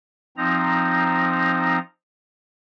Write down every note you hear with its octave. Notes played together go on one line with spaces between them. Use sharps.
F3 C4 D#4 A#5